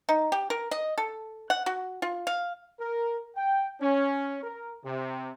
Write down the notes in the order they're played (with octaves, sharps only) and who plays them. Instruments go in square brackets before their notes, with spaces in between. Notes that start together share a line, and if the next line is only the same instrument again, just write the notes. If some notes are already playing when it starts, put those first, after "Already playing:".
[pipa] D#4
G4
A#4
D#5
A4
F#5
F#4
F4
F5
[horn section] A#4
G5
C#4
A#4
C3